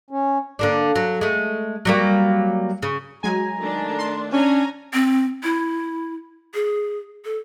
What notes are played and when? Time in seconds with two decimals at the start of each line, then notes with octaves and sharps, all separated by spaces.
0.10 C#4
0.59 D3 A#3 D4
0.95 F#3
1.21 G#3 A3
1.85 F#3 G3 A#3
2.82 C#3
3.23 F#3 G#3 G#5 A#5
3.58 D#3 A3 D4
3.99 C6
4.33 C#4 D4 C#5 G#5 A#5
4.93 C4
5.43 E4
6.54 G#4
7.25 A4